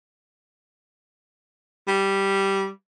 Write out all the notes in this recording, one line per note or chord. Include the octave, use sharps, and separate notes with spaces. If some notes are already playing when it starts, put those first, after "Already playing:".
G3